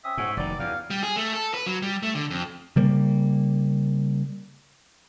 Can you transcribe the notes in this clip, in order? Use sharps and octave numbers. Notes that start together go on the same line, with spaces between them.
C4 C#4 E5 D#6
G#2 C#4 F#4 G#5
F1 D#3 F#3 G3 D5
E2 F5
G3
G#4
A3
A4
B4
F#3
G3
A3
D3
F2
C#3 G3 A#3